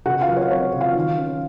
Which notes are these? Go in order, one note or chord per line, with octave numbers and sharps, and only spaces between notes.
C#3 F#4 F#5
F4 F5
F#3
C#5
C4 C#5
C#3
F4 F5
D#3
C#4